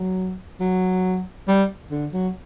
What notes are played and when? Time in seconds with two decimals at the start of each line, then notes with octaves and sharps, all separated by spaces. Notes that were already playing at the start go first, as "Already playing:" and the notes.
Already playing: F#3
0.60 F#3
1.48 G3
1.91 D3
2.13 F#3